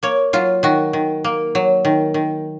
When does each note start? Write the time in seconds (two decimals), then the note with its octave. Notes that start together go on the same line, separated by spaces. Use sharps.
0.03 A#3 C#5
0.33 F#3 F4
0.63 D#3 F#4
0.93 D#3
1.24 A#3
1.55 F#3
1.85 D#3
2.14 D#3